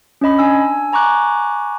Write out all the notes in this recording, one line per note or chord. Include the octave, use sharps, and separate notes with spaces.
C#4 D4 D#5 B5
D4 G#5 E6
G#5 A#5 C#6 D6 F#6